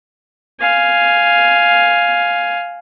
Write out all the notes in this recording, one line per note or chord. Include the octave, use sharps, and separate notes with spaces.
F5 G#5